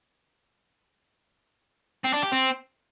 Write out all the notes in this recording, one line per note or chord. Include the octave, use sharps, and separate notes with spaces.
C4
D4
G4
C4